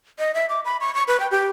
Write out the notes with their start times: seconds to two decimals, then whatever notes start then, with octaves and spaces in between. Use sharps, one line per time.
0.19 D#5
0.34 E5
0.49 D6
0.65 B5
0.81 C#6
0.95 C#6
1.08 B4
1.20 G5
1.31 G4